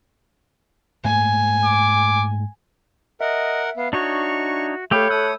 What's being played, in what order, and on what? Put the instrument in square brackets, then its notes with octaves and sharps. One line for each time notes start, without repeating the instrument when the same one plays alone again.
[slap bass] G#2 A3 A#3 [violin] G#5
[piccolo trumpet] D6
[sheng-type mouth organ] A#4 F#5 [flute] D#5 [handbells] E5
[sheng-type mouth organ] B3 [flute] F5
[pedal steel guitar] D4 D#4 C#5 [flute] F#4 [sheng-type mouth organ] C#6
[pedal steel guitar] A3 G4 [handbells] A4 B5 G6 [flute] C#5 [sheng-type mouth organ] F5
[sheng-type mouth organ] A3 D#6 [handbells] E6 [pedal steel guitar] F#6